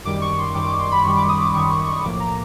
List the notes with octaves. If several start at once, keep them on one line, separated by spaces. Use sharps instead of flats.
F#2 D#3 G3 D6
C#6
C6
F#2 D#3 G3 D6
D6
C6
B5
F#2 D#3 G3 C#6
D6
D#6
D6
F#2 D#3 G3 C#6
C#6
C#6
B1 A2 F3 A#3 D6
A#5